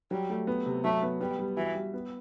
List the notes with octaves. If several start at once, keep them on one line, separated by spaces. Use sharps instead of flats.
F#3 G3
A3
B3
C3
F#3 A3
B3
G3 B3
G3
E3 F#4
G3
B3